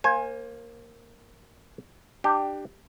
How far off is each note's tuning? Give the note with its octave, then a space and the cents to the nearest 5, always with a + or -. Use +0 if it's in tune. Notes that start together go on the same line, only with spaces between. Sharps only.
A#3 +0 C5 +35 G#5 +0
D4 +25 G4 +0